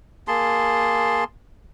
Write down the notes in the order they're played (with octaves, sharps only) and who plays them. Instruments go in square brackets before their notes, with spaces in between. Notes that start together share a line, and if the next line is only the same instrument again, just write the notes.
[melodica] A#3 G#4 A5 C6